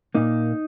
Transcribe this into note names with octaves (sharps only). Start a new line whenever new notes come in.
A#2 A#3 D#4